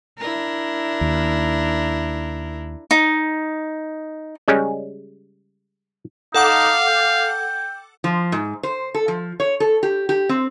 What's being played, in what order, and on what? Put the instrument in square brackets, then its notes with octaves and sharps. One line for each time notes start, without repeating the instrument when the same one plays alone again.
[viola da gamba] D4 E4 A#4
[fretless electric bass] D#2
[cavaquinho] D#4
[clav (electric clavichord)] C#3 G3 G#3 C#4
[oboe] D#4 [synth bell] A4 F#5 D6 [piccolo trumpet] F5
[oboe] G5
[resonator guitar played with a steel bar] F3
G#2
C5
A4
F3
C#5
A4
G4
G4
C4